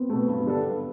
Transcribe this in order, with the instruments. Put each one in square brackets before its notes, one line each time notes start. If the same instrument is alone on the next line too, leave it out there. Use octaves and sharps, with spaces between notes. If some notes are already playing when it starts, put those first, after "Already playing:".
Already playing: [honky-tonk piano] B3 C4
[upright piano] B2 A3
G2
D3 G3 D4 A4
G2